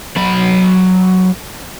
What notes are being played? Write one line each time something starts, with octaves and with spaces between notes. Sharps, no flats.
F#3 B5